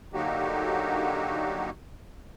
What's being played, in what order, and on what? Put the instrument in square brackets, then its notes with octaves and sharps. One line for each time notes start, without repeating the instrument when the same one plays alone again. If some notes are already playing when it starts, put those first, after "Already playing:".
[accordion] D3 F#3 A#3 D#4 F#4 G4